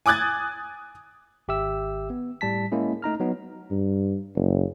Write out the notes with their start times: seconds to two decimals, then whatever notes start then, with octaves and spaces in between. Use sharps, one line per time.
0.06 G#5 D6 D#6 F#6 G#6 A6
1.48 G#1 G4 E5 E6
2.10 B3
2.41 A2 G3 A5 B6
2.72 G#3 A#3 C#4 E4 G#4
3.02 A3 D#4 A#5 F6
3.20 F#3 B3 D#4
3.71 G2
4.36 F#1